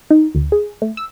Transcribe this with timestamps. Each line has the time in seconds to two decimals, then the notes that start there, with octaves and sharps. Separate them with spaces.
0.11 D#4
0.35 D2
0.52 G#4
0.82 A3
0.97 E6